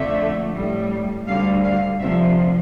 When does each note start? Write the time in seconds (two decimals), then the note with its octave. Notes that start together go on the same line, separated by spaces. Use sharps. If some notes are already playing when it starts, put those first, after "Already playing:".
Already playing: F2 D3 A3 E5
0.55 A2 G3
1.27 D2 D3 G3 F5
1.63 F5
1.99 D2 C3 F3 E5